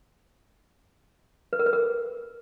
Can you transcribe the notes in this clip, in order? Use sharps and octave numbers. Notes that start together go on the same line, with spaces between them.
B4
A#4
B4
A#4